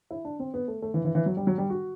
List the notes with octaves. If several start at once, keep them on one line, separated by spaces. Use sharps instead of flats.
E4
D4
C4
B3
A3
A3
E3
E3
E3
F#3
G3
F#3
G3
F#4